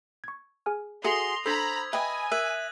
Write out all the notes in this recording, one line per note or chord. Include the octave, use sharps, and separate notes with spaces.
C#6 G#6
G#4 G#5 F6
F#4 G#4 A4 E5 C6 D#6 A#6 F7
D4 A4 C5 A#5 B5 E6 G#6
B4 D#5 E5 G5 G#5
A#4 E5 F#6 D#7 F#7